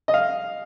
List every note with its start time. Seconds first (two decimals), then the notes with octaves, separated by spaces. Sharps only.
0.08 D#5
0.14 F5